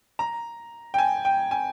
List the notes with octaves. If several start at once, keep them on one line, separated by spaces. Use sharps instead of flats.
A#5
G5
G#5
G5
G#5